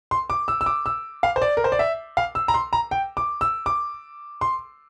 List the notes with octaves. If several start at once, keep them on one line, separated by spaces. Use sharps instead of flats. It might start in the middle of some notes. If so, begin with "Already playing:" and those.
C6
D6
E6
E6
D6
E6
F5
C5
D5
A#4
C5
D5
E5
F5
E6
A#5
C6
A#5
G5
D6
E6
D6
C6